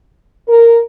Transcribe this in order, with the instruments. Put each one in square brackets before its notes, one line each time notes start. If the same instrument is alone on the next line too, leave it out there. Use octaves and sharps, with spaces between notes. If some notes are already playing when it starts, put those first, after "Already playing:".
[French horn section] A#4